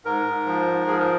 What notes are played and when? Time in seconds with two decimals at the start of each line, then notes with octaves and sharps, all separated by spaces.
0.05 G#2 A#4
0.26 G#2
0.46 F3
0.67 G#2
0.87 F3 G#4
0.99 A#4